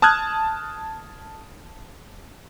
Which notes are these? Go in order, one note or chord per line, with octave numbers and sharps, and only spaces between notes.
A5 D#6 F6 F#6 G#6